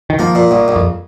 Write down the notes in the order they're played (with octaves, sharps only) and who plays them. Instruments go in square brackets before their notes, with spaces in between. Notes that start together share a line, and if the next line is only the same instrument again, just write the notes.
[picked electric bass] D#3
[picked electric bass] F3 [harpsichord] A#3
[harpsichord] A#2
A#1
A#1
[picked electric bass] F2